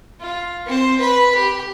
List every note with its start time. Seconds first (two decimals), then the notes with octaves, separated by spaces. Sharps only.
0.20 F4
0.66 C4 C5
0.99 B4 B5
1.35 G4